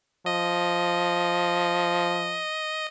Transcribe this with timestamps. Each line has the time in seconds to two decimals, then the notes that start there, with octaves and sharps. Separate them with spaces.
0.26 F3 D#5